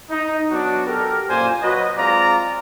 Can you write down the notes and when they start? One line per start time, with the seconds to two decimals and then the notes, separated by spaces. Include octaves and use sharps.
0.11 D#4
0.51 F#3 B3 D4 F#4
0.87 G4 A4 A#4
1.30 F#2 A#2 A#3 C5 G#5
1.63 F#3 F#4 B4 D#5
1.97 G#3 C4 F4 D5 A#5